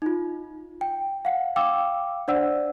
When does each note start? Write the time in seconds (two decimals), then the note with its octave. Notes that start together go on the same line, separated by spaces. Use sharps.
0.02 D#4 F4
0.81 G5
1.25 F5 F#5
1.56 F5 G5 D6 E6
2.28 D4 C5 D5 F#5 E6